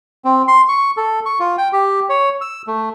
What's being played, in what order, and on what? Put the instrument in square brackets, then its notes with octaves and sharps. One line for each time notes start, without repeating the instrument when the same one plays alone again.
[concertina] C4
C6
C#6
A4
C#6
F4
G5
G4
C#5
E6
A3